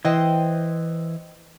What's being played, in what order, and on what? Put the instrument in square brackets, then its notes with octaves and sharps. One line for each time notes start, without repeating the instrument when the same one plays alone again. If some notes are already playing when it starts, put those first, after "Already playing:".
[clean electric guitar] E3 [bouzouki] C5 D#5 G5